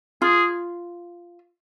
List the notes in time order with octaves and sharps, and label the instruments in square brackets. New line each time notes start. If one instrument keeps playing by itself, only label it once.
[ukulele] F4 [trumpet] G#4